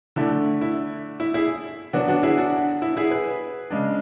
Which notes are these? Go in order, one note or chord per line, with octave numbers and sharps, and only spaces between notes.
D3 A3 D4 E4
E4
E4
E4 G#4
D3 F#3 B3 D4 F#4
D4 F#4
E4 G#4
D4 F#4
E4
E4 G#4
G#4 B4
C#3 G#3 D4